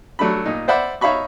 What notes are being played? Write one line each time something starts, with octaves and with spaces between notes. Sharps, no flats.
F#3 A3 D4 B5
A#2 D#4
C5 D5 E5 F#5 B5
D#4 C#5 E5 F5 B5 C#6